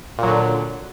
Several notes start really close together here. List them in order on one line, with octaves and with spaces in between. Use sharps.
A#2 F#3 D3